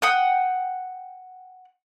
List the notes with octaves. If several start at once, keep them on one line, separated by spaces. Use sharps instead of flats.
F#5 G5 D#6